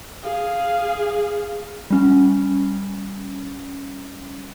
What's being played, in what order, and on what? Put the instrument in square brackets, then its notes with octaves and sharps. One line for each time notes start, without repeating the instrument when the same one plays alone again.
[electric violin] G#4 F5
[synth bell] G3 C#4